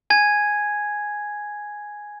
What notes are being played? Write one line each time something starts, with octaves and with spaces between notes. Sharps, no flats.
G#5 G#6